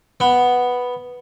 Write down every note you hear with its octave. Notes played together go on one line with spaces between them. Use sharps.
B3